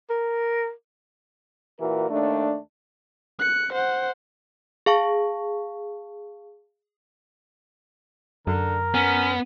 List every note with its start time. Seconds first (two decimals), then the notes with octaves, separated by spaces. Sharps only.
0.10 A#4
1.79 A#2 E3 F#4 A#4
2.09 D#2 A3 D4
3.39 F#6 C#7
3.73 C5 F#5
4.86 G#4 F5 A5 C#6
8.47 F#2 D3 A#4
8.94 B3 C#4